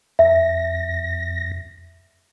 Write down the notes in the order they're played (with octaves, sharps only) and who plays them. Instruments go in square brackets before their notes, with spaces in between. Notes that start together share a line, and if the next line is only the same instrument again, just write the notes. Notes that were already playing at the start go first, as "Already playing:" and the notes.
[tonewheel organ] F2 A#6 [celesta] E5